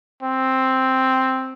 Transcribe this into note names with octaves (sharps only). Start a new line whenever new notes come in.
C4